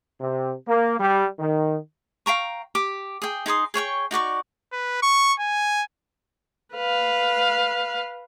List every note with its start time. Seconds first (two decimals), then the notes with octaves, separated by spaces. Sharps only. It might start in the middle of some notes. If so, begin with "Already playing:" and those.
0.21 C3
0.68 A#3
0.99 G3
1.39 D#3
2.26 F5 G5 A#5 C#6
2.75 G4 D6
3.22 G#4 G5
3.46 D#4 G#4 C6 D#6
3.74 G#4 C#5 G5 C#6
4.11 D#4 F#4 D5 C#6
4.73 B4
5.03 C#6
5.40 G#5
6.76 B4 F5